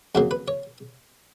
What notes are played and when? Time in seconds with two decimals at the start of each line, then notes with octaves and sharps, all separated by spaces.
0.15 F2 C#3 F#3 A#3 F#4
0.31 B4
0.48 C#5